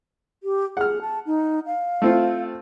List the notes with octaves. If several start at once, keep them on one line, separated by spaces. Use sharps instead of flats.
G4
G#4 F#5 F6
A5
D#4
F5
A3 C4 F4